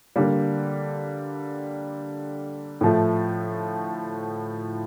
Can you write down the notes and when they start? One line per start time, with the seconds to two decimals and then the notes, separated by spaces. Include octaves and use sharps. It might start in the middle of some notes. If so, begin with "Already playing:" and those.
0.16 D3 G3 A#3
2.81 A2 F3 A3